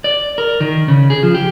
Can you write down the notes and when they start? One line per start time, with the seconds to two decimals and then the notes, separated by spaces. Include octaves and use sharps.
0.04 D5
0.38 A#4
0.60 D#3
0.88 C#3
1.10 G#4
1.23 F3
1.35 G4